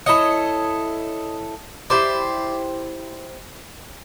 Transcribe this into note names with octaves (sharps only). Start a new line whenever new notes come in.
E4 A4 C#5 D#5
E4 G4 C5 D5